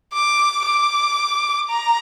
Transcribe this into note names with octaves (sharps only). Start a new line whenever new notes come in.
D6
D6
A#5